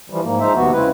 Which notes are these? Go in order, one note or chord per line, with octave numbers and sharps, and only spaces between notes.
E3 F3 G3
G#2 A#3
F3 G#3 D#4 C5 E5
D#2 C3 B3 F#4
C#3 G#3 C4 E4 B4